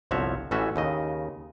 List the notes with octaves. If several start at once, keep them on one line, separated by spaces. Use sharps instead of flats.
G1 C2 F3 F#4 C#5 E5
A1 E3 A3 C#4 F#4 E5
D#2 C#3 D#5